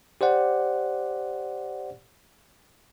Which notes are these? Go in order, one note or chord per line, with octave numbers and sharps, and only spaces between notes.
G4 C5 D5 F#5